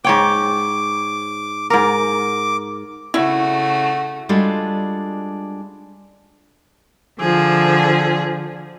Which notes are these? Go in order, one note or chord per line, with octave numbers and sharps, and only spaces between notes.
G#2 C#5 G5 D6
G#2 A#4 D6
C#3 A3 E4 F#4
G3 G#3 D4 F4 F#4 A4
D3 F3 G#4